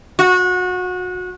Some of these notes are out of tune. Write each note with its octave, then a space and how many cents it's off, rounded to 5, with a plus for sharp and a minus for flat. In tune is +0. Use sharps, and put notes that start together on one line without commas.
F#4 -25